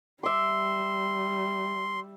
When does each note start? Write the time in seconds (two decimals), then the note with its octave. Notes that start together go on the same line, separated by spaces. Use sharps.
0.23 G3 E5 C6 D6